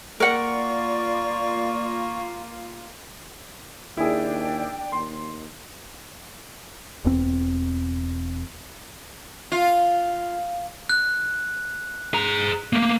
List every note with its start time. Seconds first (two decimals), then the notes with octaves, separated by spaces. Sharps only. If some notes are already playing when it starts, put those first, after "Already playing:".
0.20 A#3 F4 A#4 D5 F#5 C#6
3.97 D#2 D4 E4 G#4 D5 G5
4.92 D#2 C6
7.05 E1 E2 C4
9.52 F4
10.89 F#6
12.14 G#4 A#5
12.73 A3 A#3